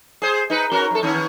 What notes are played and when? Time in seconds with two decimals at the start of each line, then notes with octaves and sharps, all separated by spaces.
0.22 G#4 C5
0.50 D#4 B4
0.72 C#4 F#4 A#4
0.91 F#2 A4
1.03 D#3 B3 C#4